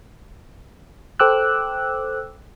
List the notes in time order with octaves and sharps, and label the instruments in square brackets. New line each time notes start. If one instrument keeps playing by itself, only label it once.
[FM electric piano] A4 C5 G5 D6 E6 F#6